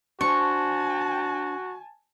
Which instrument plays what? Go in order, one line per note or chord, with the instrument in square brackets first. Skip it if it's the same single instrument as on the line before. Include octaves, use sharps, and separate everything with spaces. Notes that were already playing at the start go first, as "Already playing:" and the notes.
[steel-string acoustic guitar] D4 C5 [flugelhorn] F#4 [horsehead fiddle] G#5 A5 [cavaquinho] C#6